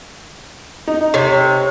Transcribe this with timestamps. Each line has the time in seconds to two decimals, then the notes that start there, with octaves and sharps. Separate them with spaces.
0.88 D#4
1.14 C3 C#5